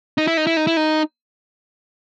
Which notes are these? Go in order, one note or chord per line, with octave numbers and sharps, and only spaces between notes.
D#4
E4
D#4
E4
D#4
E4
D#4